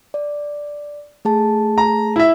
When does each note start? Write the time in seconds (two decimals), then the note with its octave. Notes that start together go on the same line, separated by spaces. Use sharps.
0.14 D5
1.25 A3 G#4 A5
1.78 A#5
2.16 E4 E5